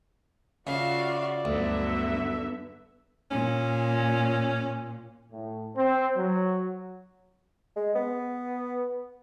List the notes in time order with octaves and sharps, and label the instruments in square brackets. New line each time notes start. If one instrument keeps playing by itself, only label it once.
[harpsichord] C#3 [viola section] F4 F#4 [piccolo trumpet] D5 [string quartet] E5 F5
[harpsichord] D2 [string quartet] G2 F#3 [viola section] D3 B3 E5
[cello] A#2 [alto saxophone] C#4
[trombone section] A2
C4
F#3
[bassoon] G#3
B3